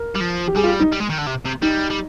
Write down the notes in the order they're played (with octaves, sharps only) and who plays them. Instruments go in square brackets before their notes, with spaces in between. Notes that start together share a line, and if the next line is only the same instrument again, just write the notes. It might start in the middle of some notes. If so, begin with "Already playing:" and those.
Already playing: [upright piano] A#4
[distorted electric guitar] G3
F3
[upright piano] G4
[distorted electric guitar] G3 [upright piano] G#4
[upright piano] F4
G4
D#4
[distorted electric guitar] G3
G#3
D#3
D3
C3
C3
[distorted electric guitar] G3 [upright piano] D#4
[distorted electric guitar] G3